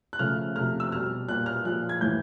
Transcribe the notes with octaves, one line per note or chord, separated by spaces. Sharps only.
F#6
C#3 F3 A3 F6
C3 F3 A3 F6
E6
B2 G3 F6
A#2 G3 F#6
F6
A#2 F3 G#3 F#6
G#6
A2 E3 G3 G6